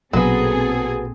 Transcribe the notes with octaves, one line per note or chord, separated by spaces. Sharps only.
A#1 B2 F#3 B3 C4 G#4 A4